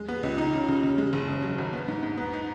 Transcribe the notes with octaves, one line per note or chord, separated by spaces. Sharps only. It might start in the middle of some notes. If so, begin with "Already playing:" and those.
Already playing: G#3
B3
C#2
D#4
C#3
C#3
C#3
G#3
F#1
C#3
F#3
G#1
B3
G#2
G#2
B3
D#4